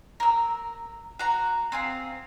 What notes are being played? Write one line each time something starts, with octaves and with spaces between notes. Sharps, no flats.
A#4 E6
F#4 A#5
C4 G#4 F5